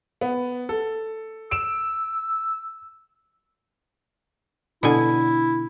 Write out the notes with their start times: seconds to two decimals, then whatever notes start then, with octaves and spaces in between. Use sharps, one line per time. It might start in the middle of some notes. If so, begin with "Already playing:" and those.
0.21 B3
0.69 A4
1.51 E6 D7 E7
4.83 B2 D3 E4 G#5